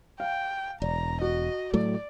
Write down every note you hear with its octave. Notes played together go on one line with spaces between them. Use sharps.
F5 G5
E1 D5 A#5
F#4 D#5
A2 F#3 A3 D5